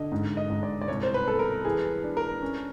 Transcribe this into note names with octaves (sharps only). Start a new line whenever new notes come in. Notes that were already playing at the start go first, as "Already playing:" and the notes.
Already playing: D3 D#5
G#2
D#5
G#2
D5
D5
C2 C#5
C5
B4
B3 A4
A#4
E3 G#4
D4
A#4
C#4